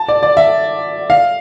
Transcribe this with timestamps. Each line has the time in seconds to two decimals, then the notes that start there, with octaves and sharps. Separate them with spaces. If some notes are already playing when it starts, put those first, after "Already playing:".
Already playing: A5
0.08 D5
0.23 D5
0.37 E5
1.10 F5